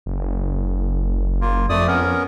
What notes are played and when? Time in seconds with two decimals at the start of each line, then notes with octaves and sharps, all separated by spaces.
0.06 F#1
1.41 A#3 F4
1.69 F2 A3 D5 D#6
1.87 B3 C#4 A#4